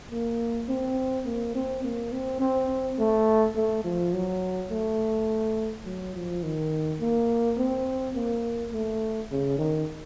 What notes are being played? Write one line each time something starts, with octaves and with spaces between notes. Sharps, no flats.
A#3
C4
A#3
C4
A#3
C4
C4
A3
A3
F3
F#3
A3
F#3
F3
D#3
A#3
C4
A#3
A3
C#3
D#3